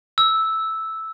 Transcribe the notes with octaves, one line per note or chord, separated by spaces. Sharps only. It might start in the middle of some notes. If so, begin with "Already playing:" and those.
E6